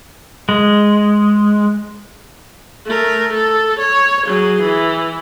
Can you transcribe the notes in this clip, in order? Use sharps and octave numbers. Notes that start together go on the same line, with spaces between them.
G#3
A3 A#4
A4
C#5
F#3 G#4
E3